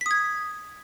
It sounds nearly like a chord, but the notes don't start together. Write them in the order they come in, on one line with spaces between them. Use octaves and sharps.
B6 D#6 G#6